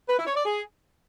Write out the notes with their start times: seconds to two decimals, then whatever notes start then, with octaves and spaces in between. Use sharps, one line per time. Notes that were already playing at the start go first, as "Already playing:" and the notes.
0.08 B4
0.17 E4
0.26 C#5
0.35 D5
0.45 G#4